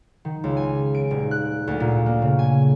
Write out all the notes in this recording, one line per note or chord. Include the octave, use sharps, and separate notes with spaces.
D#3
C#2
G#5
D7
D#1
F#6
D2
A#2
A#3
C#3
G#5